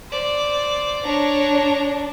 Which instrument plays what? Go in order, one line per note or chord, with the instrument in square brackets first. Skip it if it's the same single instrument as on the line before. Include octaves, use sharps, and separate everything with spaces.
[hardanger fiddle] C5 D5
[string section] D4 [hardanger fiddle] C#5 A#5